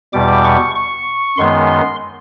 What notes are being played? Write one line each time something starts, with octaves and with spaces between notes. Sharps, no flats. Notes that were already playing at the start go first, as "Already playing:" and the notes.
E2 B2 G3 D6
C#6
C#6
F#2 D#3 G#3 B3 C6